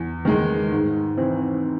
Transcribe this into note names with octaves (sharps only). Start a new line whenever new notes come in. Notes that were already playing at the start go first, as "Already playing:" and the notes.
Already playing: E2
D#3 G#3
G#2
E3 C4